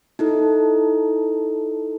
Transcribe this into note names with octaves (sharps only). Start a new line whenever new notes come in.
D#4 E4 A4